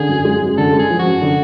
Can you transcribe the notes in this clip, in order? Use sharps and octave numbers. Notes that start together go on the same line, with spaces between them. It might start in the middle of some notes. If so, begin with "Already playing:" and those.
Already playing: D3 G#4
F#2
G#3
F#2
D3 A4
G#3
G#4
F3
F#4
F#2
D3